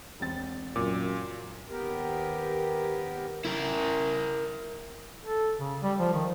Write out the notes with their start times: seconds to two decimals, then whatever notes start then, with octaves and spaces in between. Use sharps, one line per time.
0.20 E1 C4 A6
0.76 F#2 A#2 D6
1.69 D#2 B3 G4 A#4
3.45 E4 A#4
5.24 A4
5.58 C#3
5.83 G3
5.99 F3
6.14 D#3